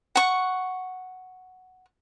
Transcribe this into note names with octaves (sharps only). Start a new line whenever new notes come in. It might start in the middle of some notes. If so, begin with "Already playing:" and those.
F#5 C#6